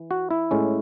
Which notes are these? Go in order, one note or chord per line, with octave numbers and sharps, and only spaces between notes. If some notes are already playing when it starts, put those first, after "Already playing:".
Already playing: E3
F#4
E4
A2 G#3 C#4